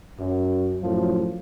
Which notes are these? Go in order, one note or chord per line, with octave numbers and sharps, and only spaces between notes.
F#2
F#2 A2 F3